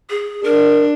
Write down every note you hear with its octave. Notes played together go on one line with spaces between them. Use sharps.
G#4
D4 A#4